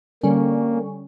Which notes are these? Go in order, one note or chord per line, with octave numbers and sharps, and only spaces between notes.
D3 G3 A#3 C#4